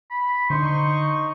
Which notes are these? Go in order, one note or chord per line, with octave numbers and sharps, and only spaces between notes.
B5
D3 D#4 C5 C#6